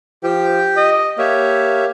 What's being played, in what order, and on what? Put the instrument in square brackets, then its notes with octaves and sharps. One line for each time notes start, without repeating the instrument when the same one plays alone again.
[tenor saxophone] F3 [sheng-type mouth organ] G4 G5
[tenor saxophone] D#5
[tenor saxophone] A#3 [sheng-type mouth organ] G4 C#5 E5